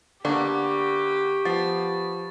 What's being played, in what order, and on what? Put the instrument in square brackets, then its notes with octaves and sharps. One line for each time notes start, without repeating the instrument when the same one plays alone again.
[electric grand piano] D3 [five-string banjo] A#3 B3 D4 [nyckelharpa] G4 [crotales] C#6
[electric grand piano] F3 C7 [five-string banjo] B3 [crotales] A6